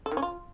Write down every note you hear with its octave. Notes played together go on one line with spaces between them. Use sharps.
A4
D#3
C#4
F4